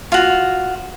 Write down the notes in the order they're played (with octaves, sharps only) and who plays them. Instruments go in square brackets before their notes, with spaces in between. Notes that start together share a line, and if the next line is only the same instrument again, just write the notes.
[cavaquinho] F4 F#4